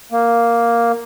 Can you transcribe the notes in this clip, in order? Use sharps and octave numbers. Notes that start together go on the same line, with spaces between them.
A#3